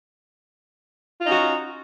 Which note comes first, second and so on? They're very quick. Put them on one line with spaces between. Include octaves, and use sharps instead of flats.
F4 D#4 C#4 F#4